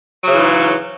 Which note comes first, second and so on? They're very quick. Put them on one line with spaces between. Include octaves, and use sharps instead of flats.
F#3 C#3 E3 G#2